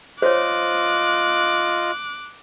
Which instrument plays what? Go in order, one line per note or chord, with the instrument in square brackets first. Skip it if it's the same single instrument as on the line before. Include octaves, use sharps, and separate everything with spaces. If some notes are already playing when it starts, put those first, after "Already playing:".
[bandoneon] F4 D#5 [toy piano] C5 C#5 [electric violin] D6 F#6